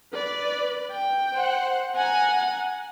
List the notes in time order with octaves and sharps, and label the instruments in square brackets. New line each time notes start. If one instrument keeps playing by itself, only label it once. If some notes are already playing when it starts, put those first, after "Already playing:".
[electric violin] B4 D5
G5
[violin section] C5 F#5
[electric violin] F#5 [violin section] G#5 A#5